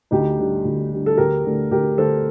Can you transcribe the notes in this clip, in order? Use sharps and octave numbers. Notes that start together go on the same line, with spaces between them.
D2 D#4 G4
D3 G3
D2
D3 G3
A4
D2 G4 A#4
D3 A3
D2 G4 A#4
D3 A3 A4 C5